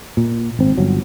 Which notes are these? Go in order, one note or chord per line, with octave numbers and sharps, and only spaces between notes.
A#2
G#1 C4
G1 F#3